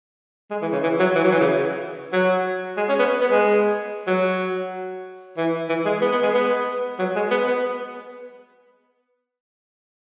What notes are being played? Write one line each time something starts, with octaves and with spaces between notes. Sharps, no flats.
G#3
E3
C#3
E3
F#3
E3
F#3
E3
C#3
F#3
G#3
C#4
B3
B3
G#3
F#3
E3
E3
G#3
B3
B3
G#3
B3
F#3
G#3
B3
B3